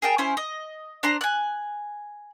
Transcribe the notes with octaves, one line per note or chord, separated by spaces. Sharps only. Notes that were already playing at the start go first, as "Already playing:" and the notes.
G#4 A#4 G5 A5
C#4 E4 C5
D#5
D4 C5 A#5 C6
G#5 F#6